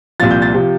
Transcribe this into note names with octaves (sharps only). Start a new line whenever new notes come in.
C2 A#2 F3 A6
G6
A6
C3 F3